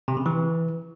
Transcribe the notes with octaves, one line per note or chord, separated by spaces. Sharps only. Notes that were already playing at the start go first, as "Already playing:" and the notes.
C3
C#3
E3